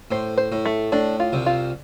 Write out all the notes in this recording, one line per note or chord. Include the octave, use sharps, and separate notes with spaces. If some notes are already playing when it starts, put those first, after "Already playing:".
A2 C5
C5
A2
A3
A2 D4
F4
C2 C3
F4